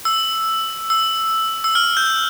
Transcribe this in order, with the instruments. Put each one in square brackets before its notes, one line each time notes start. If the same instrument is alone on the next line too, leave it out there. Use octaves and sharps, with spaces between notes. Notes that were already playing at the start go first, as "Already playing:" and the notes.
[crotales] E6
E6
E6
F6
G6